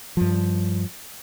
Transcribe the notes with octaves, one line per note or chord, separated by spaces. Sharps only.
G2 F3